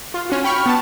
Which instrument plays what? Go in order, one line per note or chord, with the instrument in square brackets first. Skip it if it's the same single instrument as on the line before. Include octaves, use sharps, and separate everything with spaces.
[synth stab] F4
C#4 F#4
G5 B5 C#6 F6
B3 A5